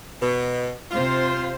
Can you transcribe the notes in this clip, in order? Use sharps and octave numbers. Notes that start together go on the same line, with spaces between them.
B2
C3 F4 C5